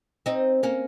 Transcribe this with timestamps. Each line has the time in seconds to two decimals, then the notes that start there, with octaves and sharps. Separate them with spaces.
0.26 C4 D#4
0.63 A#3 C#4